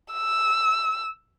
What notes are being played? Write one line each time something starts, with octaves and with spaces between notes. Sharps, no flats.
E6